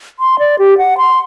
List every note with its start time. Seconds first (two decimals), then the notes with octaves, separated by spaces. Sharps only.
0.19 C6
0.39 D5
0.59 G4
0.78 F#5
0.98 C6